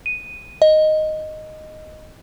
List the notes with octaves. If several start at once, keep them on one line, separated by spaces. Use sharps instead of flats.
D#7
D#5